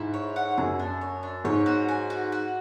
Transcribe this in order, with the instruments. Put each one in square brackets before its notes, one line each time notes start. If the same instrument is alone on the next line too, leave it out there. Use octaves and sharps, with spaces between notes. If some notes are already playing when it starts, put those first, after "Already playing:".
Already playing: [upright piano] G#2 [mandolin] E4
[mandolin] C#5
F#5
[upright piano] F#2 [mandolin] G#4
[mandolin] D4
C#5
D4
[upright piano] G#2 [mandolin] C#5
[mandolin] F#4
G#5
F#4
F#4